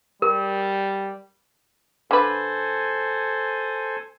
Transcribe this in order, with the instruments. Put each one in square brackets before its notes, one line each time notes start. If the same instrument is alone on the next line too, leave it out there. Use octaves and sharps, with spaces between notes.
[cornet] G3 [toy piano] A#4
[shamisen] D3 B4 [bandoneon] A4 C5 G#5